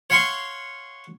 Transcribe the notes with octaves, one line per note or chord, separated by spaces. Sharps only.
C#5 F5 F#5 C6 C#6